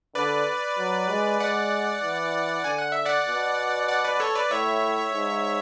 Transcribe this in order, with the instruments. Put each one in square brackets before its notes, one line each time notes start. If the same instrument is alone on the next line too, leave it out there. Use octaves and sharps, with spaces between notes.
[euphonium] D3 [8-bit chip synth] B4 D5
[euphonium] F#3
G#3
[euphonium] G#3 [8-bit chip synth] D5 F#5
[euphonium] E3
[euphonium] D3 [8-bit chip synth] G#5
[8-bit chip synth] F#5
E5
D5 F#5
[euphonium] B2
[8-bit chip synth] D5 F#5
B4 D5
A4 C#5
B4 D5
[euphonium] A2 [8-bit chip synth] C#5 E5
[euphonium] G#2